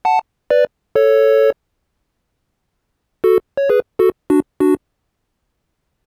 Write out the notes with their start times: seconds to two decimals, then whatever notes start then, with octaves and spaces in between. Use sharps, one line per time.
0.05 F#5 A5
0.50 B4 D5
0.95 A4 C#5
3.24 F#4 A4
3.57 C#5
3.69 G#4 B4
3.99 F#4 A4
4.30 D4 F#4
4.60 D4 F#4